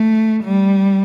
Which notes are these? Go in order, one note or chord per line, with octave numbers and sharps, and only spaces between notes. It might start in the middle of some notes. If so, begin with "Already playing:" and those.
Already playing: A3
G3